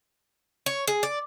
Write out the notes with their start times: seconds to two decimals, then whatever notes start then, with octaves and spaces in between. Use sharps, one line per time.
0.66 C#5
0.88 G#4
1.03 D5